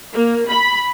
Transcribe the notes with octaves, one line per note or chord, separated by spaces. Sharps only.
A#3
B5